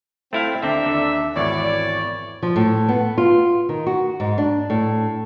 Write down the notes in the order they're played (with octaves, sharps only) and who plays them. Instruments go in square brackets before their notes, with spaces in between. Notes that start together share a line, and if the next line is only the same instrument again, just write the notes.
[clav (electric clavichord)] A3 E4 F5 [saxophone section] C4
[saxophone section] D#2 D4 E5 [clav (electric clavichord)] D3 C4
[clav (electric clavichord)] D3
[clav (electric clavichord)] G#1 E2 [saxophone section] E4 C#5 D5
[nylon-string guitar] F3
A2
B3
F4
D#3
F#4
G#2
D4
A2